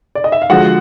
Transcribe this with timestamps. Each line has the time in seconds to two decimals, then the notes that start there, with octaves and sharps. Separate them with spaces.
0.15 D5
0.24 D#5
0.32 E5
0.42 F5
0.50 D3 F3 G#3 F#4 F#5